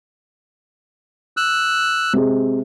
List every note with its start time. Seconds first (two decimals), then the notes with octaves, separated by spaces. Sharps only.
1.37 E6 F#6
2.13 C3 G#3